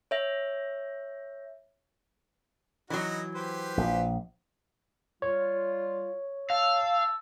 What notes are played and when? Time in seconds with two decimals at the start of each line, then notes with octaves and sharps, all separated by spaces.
0.11 C#5 E5
2.90 E3 F#3 D#4 F#4
3.35 G4 B4 C5
3.77 A#1
5.22 G3 F4 C#5
6.50 F5 A5 E6